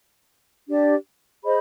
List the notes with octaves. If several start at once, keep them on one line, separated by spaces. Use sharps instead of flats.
D4 G4 D5
G#4 C5 D#5 B5